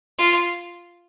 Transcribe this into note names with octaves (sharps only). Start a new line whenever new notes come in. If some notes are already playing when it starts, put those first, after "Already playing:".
F4